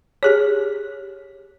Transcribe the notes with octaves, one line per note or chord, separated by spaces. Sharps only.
G4 G#4 C#5